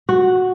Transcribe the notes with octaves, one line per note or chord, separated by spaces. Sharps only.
F#4